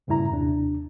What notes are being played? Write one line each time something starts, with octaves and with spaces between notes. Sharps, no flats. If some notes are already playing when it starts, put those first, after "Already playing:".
D2 G2 A#2 C#3 E4 A#5
D#2 C3 D4